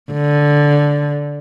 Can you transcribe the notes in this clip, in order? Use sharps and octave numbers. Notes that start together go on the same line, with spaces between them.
D3